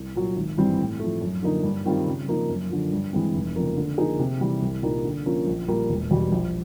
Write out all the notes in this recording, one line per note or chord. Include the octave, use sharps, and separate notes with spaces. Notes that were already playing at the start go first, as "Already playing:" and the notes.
Already playing: C2
A#2 F#3
G#1
G2 E3 G3 C4
A2
F3 A3
F#2
D3 F3 A#3 D#4
G2
D#3 G3 C4 F4
C#3
F3 A#3 D#4
F#2
D3 F3
G2
E3 G#3 C4
F1
F2 C#3 F3 A#3
D3
F3 A#3 D#4 G#4
C3
E3 G3
C2
A#2 G3 A#3 D#4
D3
F3 A#3 C#4 F4
A#1
A#2 G3 A#3
E1
E2 B2 G3
A#1